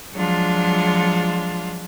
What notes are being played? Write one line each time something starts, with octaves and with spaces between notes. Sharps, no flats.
F3 F#3 G#3 D4 F4